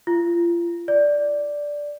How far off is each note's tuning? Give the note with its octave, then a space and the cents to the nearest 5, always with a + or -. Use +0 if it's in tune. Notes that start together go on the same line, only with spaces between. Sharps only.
F4 -35
D5 -5